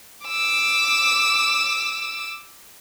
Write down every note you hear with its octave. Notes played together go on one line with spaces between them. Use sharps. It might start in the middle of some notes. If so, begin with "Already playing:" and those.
D6 E6